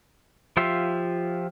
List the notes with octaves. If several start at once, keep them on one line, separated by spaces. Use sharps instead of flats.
F3 F4 G4 E5 C6